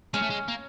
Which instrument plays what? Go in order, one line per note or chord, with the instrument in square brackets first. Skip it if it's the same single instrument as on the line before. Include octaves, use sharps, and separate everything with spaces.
[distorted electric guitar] G#3 [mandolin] C#4
[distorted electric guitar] A3
G#3
A#3